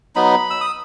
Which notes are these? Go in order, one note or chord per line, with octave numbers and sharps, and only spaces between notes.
F#3 B3 D#4 B5
E6
D#6